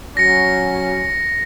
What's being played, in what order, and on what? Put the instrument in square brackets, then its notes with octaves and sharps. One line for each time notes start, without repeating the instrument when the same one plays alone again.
[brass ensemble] F#3 C#4 [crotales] A#6 C#7